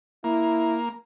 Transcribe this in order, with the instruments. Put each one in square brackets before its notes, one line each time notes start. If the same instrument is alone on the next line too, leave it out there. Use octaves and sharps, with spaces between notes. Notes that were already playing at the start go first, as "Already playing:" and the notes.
[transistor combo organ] A#3 [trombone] E4